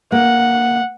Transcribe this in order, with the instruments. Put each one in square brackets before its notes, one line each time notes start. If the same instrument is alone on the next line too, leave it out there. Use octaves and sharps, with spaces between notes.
[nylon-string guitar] A#3 [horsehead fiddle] F#5